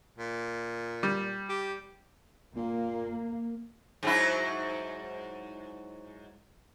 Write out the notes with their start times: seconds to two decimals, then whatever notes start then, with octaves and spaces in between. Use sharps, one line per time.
0.18 A#2
1.03 G3
1.49 G4
2.56 A#2 A#3
4.03 G#2 F#3 E4